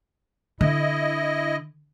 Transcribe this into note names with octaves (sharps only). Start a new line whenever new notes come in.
D3 E4 D#5